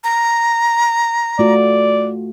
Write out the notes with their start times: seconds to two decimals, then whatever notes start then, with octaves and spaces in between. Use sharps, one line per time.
0.04 A#5
1.39 A3 F4 F#4 D5